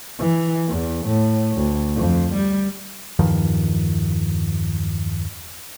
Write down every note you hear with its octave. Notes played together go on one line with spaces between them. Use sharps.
E3
E2
A2
D2
F2
G3
E2 G2 D#3 F3